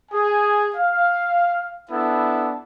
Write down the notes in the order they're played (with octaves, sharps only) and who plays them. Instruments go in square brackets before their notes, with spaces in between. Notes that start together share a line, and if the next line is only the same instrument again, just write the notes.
[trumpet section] G#4 G#5
F5
B3 D4 E4 A4